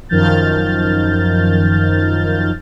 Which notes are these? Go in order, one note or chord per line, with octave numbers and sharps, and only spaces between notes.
F#2 D#3 F3 F6 G6 A6